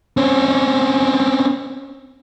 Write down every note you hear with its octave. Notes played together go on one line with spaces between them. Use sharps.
C4 C#4